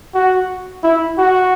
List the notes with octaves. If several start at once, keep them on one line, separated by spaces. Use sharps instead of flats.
F#4
E4
F#4